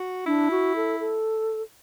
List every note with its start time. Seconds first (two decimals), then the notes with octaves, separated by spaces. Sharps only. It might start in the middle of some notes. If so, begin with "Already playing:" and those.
Already playing: F#4
0.26 D4 E4
0.51 F#4
0.76 A4
1.00 A4